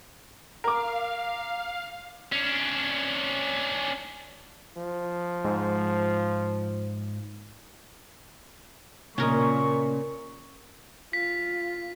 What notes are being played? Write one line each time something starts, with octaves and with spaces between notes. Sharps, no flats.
A#4 F5 D6
C#4 D4
F3
G#2
A#2 C#3 C#4 A#4 D#5 C#6
F4 B6